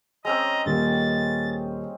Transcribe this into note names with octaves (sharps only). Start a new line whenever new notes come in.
G#3 C4 C#4 D#5 A#5
D#1 A#3 A6